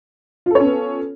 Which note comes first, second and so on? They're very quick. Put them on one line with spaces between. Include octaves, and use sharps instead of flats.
F4 A4 C#5 C#4 B3